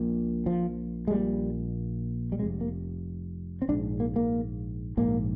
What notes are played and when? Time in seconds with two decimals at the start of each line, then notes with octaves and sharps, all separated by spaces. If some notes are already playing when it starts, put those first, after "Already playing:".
Already playing: A#1 A#2
0.46 F3
1.07 G#3
1.11 A#1 A#2 G3
2.32 G3
2.39 F1 F2 C3 G#3
2.61 A#3
3.62 C4
3.68 A#1 G#2 D4
4.00 A#3
4.16 A#3
4.97 A#1 G#2 A#3